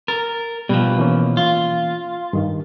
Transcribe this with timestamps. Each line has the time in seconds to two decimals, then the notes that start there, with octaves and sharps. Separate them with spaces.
0.08 A#4 A6
0.69 B2 F3 G3
0.99 E3 A#3 C#4
1.37 F4
2.33 G2 D#3